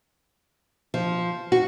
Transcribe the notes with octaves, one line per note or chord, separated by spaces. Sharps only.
F3
F#4